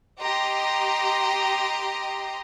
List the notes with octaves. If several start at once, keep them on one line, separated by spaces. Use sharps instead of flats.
G4 D#5 A#5 C6